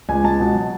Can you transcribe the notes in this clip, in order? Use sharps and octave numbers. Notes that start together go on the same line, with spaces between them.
C#2 G#5
C#2 A5
B2
F#3